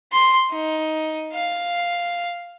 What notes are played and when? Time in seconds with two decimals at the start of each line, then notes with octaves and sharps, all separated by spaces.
0.13 C6
0.51 D#4
1.33 F5